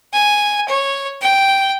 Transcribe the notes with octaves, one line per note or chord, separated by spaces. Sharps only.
G#5
C#5
G5